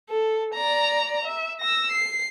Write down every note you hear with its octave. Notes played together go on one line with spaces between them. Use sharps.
A4
D5 A#5
E5
E6 A#6
C7